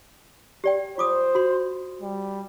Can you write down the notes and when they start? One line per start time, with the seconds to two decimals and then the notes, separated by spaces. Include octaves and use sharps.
0.64 G4 D5 G5
0.98 F4 C5 D6 D#6
1.35 F#4 C6
2.02 G3